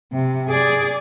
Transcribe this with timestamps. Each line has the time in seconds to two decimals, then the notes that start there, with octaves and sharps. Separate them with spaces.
0.12 C3
0.49 G#4 D5